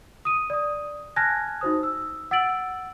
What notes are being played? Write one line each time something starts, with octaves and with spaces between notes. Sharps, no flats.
D#6 D#7
D5 D#6
G#5 A5 F6 F#6 G#6 A#6
D#4 F#4 C5 D#6
E6
F#5 E6 A6 D7 F#7